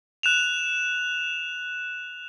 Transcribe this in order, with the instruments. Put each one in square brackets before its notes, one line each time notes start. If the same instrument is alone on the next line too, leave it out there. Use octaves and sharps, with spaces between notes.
[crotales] F#6 E7 F7